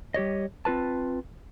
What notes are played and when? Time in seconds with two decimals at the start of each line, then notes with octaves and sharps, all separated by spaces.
0.14 G3 G4 C#5 D#5
0.65 C4 F4 B4 A5